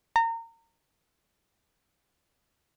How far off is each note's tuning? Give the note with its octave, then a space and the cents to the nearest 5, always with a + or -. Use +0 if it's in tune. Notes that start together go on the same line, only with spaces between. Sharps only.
A#5 -30